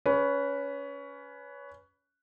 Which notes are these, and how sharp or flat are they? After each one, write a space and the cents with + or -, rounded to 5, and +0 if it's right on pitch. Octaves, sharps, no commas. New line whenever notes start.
C#4 +20 B4 +0